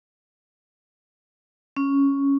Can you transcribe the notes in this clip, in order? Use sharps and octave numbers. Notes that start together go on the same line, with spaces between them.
C#4